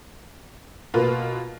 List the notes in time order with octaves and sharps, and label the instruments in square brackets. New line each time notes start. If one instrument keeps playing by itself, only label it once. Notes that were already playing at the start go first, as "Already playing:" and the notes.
[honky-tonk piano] B2 A#3 F4 B4